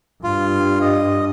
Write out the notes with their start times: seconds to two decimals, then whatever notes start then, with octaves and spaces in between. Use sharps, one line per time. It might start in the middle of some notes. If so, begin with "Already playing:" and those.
0.24 G2 F4
0.81 D#5